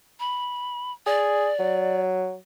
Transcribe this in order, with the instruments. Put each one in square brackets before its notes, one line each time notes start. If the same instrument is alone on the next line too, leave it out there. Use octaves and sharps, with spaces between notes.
[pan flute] B5
[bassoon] G#4 [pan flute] D5
[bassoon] F#3